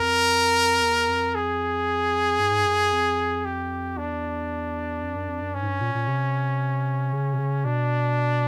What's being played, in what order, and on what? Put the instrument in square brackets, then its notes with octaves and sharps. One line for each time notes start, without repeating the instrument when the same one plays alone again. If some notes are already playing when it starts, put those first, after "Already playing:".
Already playing: [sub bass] F2 [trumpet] A#4
[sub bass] E2
F2
[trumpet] G#4
[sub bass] G2
G#2
G2
F#2
F2
[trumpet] G4
[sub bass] E2 [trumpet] D4
[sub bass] F2
F#2
F2
F#2
[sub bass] G2 [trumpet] C#4
[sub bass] G#2
G2
A#2
A#2
C3
C#3
C3
C#3
[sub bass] B2 [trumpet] D4